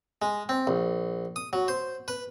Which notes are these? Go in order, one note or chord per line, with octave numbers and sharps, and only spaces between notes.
G#3
C4
A#1
D#6
F#3
C5
B4